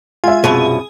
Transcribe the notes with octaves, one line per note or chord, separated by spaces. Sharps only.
G#3 F4 E5 G#5
C2 F#2 B2 G#4